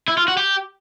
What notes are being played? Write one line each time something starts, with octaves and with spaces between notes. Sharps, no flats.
E4
F4
F#4
G4